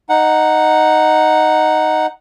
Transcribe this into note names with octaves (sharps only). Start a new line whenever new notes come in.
D#4 F#5